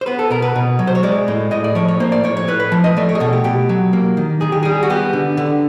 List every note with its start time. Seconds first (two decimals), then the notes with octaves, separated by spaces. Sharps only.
0.01 C5
0.06 B3 B4
0.19 A4
0.30 B2 A#4
0.42 B4
0.56 B2
0.79 F#3
0.87 C5
0.95 C#5
1.03 G#3 D5
1.28 A2
1.51 A2 D#5
1.64 D5
1.75 F3 C#5
1.88 C#5
2.00 A#3 C5
2.12 D5
2.24 A2 C#5
2.37 C#5
2.48 A2 B4
2.60 B4
2.72 F3
2.84 D#5
2.97 A3 D5
3.09 C#5
3.15 G#4
3.20 B2 A4
3.33 G4
3.44 B2 G4
3.69 F#3
3.93 A#3
4.17 D#3
4.41 D#3 G#4
4.52 G4
4.63 G3 G#4
4.83 F#4
4.90 B3 G4
5.13 D3
5.37 D3